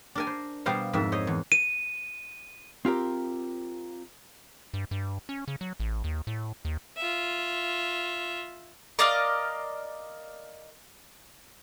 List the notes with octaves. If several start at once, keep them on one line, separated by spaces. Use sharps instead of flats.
D4 A#4 G#5
C5
B2 G3 C5 F5 G#5 A#5
F2 G#2 A#4 E5
C5 C#5 D#5
E2
D#7
C4 F4 G4 A#4
G2
G2
C#4
C#3
F#3
A1
D#2
A2
D#2
F4 E5
A#4 D5 D#5 F5